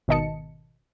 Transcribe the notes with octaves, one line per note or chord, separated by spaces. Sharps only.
G#1 B2 D#3 D#5 A5 C#7